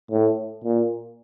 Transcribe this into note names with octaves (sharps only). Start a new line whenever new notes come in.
A2
A#2